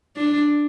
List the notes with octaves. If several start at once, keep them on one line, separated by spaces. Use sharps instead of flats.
D4